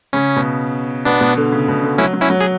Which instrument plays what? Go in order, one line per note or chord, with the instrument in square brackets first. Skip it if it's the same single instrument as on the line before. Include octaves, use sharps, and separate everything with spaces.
[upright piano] C#3 [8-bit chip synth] C#4
[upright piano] B2
[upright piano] B2 [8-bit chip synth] B3 D4
[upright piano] B2
D3
C#3
B2
D3
[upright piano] F#3 [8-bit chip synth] C#4 E4
[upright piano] F#3
[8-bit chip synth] C#4 E4
[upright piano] F#3
[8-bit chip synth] G#4